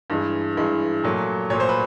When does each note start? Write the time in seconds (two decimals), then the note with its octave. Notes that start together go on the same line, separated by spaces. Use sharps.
0.10 G2 E3 G#3
0.57 G2 E3 G#3
1.04 A#2 F#3 A3
1.50 A#2 F#3 A3 C#5
1.60 C5
1.69 B4